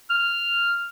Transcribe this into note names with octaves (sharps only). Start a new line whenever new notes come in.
F6